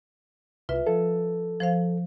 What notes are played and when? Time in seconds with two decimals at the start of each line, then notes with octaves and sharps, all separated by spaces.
0.69 C2 F4 B4 E5
0.87 F3 A4
1.60 F3 C5 F5